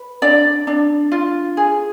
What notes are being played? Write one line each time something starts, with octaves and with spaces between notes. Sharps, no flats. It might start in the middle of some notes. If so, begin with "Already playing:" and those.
Already playing: B4
D4 D5
D4
F4
G#4